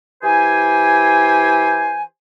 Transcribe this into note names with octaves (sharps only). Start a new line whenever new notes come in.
E3 E4 G4 C5 G#5